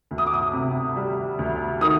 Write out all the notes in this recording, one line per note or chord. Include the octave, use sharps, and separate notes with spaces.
D2
D#6
D6
D#6
C3
G3
D2
D#3 D#6